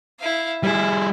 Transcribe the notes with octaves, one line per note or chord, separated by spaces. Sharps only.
E4 F5
G3 E4 G#4